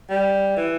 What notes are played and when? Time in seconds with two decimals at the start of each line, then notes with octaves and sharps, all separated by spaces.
0.10 G3
0.57 E3